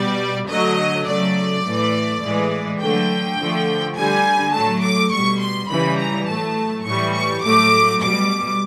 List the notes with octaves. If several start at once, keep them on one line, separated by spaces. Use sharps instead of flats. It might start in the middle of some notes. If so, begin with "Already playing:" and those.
Already playing: B2 G3 D5
D3 F#3 A3 D#5
C#3 F#3 A3 D5
A2 E3 A3
A2 E3 G#3
D3 F#3 A3 G5
D3 F3 A3
D3 G3 G#5
A2 F#3 A3 A5
D6
B2 G3 C#6
C6
C#3 E3 G3 B5
A#5
A2 F#3 A3 A5
A2 E3 G3 C#6
C#6
A2 F#3 A3 D6
B2 G3 D6